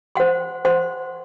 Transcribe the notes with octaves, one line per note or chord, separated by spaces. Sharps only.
C5 F#5 C6
C5 F#5 C6